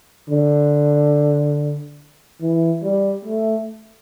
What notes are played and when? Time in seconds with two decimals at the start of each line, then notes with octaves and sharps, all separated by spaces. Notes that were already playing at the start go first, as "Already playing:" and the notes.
0.30 D3
2.41 E3
2.83 G3
3.25 A3